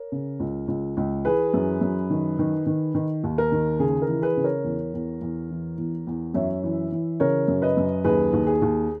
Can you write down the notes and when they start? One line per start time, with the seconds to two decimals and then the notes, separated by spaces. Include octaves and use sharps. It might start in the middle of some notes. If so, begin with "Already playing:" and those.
Already playing: A#4 C#5
0.12 C#3
0.40 C#2
0.68 C#2
0.97 C#2
1.25 E3 G#4 B4
1.54 F#2
1.81 F#2
2.10 D#3
2.39 D#3
2.66 D#3
2.95 D#3
3.24 D#2
3.38 A#4
3.52 D#3
3.79 C#3 G#4
4.02 A#4
4.08 E3
4.22 G#4 B4
4.37 C#3
4.44 A#4 C#5
4.64 E2
4.94 E2
5.22 E2
5.51 E3
5.78 E2
6.07 E2
6.34 F#2 C#5 E5
6.64 E3
6.92 E3
7.20 C#3 A#4 C#5
7.48 F#2
7.62 B4 D#5
7.77 F#2
8.04 D#2 G#4 B4
8.33 D#2
8.47 G#4
8.62 D#2